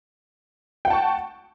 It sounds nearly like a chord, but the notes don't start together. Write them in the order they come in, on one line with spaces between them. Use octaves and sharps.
G5 F#5 A5 C#6